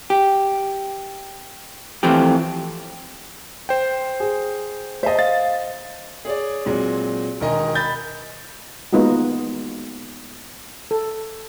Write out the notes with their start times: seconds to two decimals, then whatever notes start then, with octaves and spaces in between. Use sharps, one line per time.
0.10 G4
2.03 E3 F3 A3 C4 G4
3.69 C5 G5
4.20 G#4
5.03 C5 D#5 E5 A5
5.19 F5 A6
6.25 G#4 C#5 D5
6.65 A#2 F#3 G#3 C4
7.40 E1 D#3 A#4 D#5 G#5 A#5
7.75 D#5 B5 G6 A6
8.93 G#3 A#3 B3 D#4 F4 F#4
10.91 A4